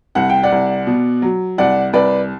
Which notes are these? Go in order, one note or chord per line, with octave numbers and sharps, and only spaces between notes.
C2 F#5
G5
D5 F#5
C2
B2
F#3
C2 D5 F#5
C2 B4 D5